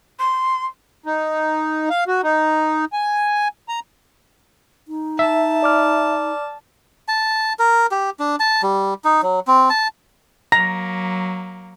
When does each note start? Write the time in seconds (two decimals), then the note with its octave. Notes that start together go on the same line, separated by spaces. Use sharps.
0.19 C6
1.06 D#4
1.90 F5
2.07 F#4
2.23 D#4
2.93 G#5
3.69 A#5
4.88 D#4
5.19 E5 A5
5.62 D5 D6 F6
7.08 A5
7.59 A#4
7.91 G4
8.20 D4
8.40 A5
8.63 G3
9.05 D#4
9.22 F#3
9.47 C4
9.70 A5
10.52 F#3 A#3 A#5 A#6